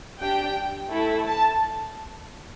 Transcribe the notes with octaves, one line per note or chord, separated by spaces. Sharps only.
D4 G4 G5
A3 E4 A4
A5